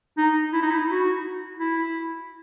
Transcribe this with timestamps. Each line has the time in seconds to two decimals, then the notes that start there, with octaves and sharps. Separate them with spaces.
0.18 D#4
0.53 E4
0.62 D#4
0.71 E4
0.89 F#4
1.60 E4